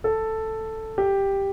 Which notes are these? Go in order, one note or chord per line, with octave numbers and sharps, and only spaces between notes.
A4
G4